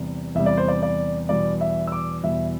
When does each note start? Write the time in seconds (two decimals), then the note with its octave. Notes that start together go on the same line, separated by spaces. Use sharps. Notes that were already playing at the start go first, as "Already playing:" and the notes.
Already playing: E2 C3 G3
0.35 E2 C3 G3 E5
0.46 D5
0.57 C5
0.68 D5
0.83 D5
1.29 E2 B2 G3 D5
1.61 E5
1.87 E6
1.92 D6
2.24 E2 B2 G3 E5